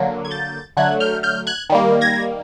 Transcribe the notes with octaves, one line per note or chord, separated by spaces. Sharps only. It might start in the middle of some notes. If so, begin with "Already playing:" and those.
Already playing: D3 F#3 A#3
G#6
G6 A6
D3 F#3 A3 F#6 G#6
F6 G6
F6 G6
F#6 G#6
D#3 G3 A#3
G#6 A#6